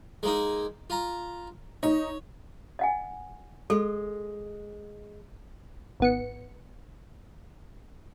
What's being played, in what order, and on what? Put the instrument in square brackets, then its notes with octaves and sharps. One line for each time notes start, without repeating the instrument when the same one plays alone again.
[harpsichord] G#3 A#3 D#4
F4 A#5
[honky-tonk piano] D#4 [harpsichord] C#5
[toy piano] D#5 F#5 G#5
[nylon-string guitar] G#3 [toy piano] A4
[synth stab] G#1 B3 C#7